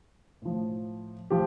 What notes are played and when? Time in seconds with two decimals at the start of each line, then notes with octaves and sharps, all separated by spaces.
0.42 A2 F3
1.30 F3 G4